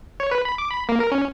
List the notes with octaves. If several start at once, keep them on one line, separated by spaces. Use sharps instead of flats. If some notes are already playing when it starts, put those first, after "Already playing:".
C#5
B4
B5
D6
B5
A#3
A#4
C#4